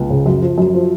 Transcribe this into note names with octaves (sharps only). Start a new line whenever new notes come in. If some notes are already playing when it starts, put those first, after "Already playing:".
Already playing: C#2
C#3
F#2
F3
F#2
F3